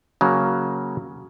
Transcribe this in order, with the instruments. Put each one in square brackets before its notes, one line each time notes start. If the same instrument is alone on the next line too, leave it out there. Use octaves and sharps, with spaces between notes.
[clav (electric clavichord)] C#3 F#3 A#3